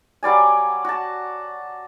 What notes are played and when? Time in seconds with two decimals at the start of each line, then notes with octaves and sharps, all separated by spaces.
0.23 F#3 G3 D5 G#5
0.84 F#4 A5